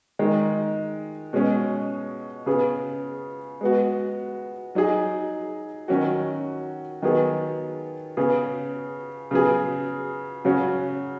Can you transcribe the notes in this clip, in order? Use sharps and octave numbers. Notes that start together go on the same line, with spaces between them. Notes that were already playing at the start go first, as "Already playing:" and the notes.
D#3 G#3 D#4
B2 G#3 C#4
C#3 B3 G#4
G#3 B3 F#4
F#3 D#4 G#4
D#3 F#3 C#4 F#4
D#3 F#3 B3 G#4
C#3 B3 G#4
C#3 F#3 B3 G#4
C#3 F#3 C#4 F#4